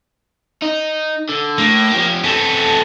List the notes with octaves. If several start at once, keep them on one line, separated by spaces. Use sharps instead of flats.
D#4
D3
A2 A#3
F3 G4
E2 B3 C4 A4